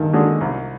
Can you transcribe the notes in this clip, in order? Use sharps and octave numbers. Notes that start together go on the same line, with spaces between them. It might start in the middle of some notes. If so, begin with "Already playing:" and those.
Already playing: G2 D#3
D3 G#3 D4
C2